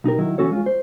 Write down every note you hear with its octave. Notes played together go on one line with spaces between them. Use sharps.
B1 D#4 G4 A#4
D#3 F#3 E4
E3 G#3 C#4 F#4 A4 C#5
G#3 F4
C5